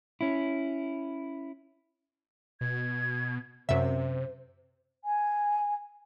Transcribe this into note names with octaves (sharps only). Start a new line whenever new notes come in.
C#4 E4
B2 G#6
F#2 C3 C5 E5
G#5